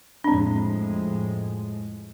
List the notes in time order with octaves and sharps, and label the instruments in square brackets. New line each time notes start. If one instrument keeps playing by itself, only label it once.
[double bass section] F2 A2 G#3 [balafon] C4 D4